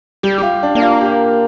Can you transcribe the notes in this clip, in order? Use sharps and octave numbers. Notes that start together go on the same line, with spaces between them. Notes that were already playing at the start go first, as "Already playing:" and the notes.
G3 G4
G4
F4
D4
A#3 D4
F4
G4